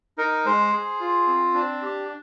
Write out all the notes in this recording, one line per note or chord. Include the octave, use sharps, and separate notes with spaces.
D#4 A#4
G#3 C5
G#4
F4
C4
D4
G4